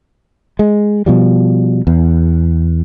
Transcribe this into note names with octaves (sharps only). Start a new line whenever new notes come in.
G#3
B2 F3 G3
E2